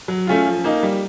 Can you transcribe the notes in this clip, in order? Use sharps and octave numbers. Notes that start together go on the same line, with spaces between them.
F#3
A3 C#4 F4
F3
A#3 D#4
G3